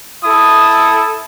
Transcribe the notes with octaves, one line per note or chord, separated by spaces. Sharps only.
E4 A4 D#6